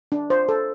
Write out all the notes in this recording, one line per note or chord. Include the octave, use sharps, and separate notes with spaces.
D4
C5
A4